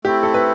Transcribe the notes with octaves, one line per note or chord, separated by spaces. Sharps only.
A3 C4 E4 G4
A4
B4